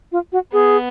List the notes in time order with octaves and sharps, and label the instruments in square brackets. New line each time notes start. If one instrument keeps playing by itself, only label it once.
[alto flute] F4
F#4
[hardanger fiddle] B3 [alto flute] G#4